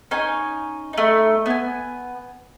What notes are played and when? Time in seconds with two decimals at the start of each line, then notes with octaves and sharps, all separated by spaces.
0.11 C#4 D#4 G#5
0.93 A3 D#4
1.46 B3 G#5